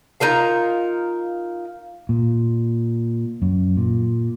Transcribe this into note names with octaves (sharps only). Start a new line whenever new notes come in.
D#4 F4 A#4 F5
A#2
F#2
A#2